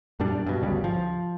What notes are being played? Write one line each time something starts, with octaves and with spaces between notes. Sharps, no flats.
F#2 A#2 G3 D4
G2 B2
G#1 D2 C#3 G3
F3